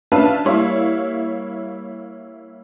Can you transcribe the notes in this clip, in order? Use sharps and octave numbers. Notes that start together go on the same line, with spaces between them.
C#4 D4 B4 E5 F5 A5
G3 A#3 E4 C#5 E5 F5